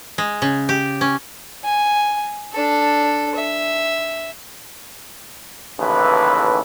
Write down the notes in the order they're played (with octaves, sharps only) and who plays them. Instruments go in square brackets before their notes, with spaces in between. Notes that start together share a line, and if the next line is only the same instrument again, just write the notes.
[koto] G#3
C#3
G4
C#4
[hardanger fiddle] G#5
D4 A4
E5
[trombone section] A1 D#2 C#3 E3 A4 B4